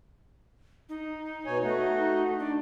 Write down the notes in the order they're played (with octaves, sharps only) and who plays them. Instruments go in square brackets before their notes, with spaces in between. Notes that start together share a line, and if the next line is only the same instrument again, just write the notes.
[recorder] D#4
[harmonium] B2 C#5 G#5
A3 F#4
[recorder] D4